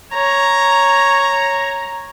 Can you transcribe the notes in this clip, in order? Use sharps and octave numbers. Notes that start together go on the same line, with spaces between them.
C#5 A#5